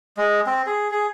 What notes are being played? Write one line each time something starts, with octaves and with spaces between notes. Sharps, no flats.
G#3
C4
G#4
G#4